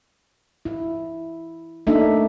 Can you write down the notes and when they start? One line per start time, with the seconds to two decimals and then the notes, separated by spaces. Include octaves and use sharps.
0.65 E4
1.87 A3 A#3 D4 D#4 E5